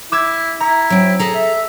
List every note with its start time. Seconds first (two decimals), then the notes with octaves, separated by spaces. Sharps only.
0.12 E4 D6 E6 G#6
0.60 E4 A#5
0.90 F#3 C4 D7
1.19 G#4 A4 A#5
1.35 E5